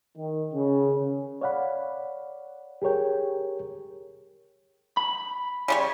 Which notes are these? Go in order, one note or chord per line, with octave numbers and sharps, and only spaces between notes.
D#3
C#3
C#5 D5 F5 F#5 B5
G4 G#4 A#4 C#5 G5
B5
C#3 G3 C#5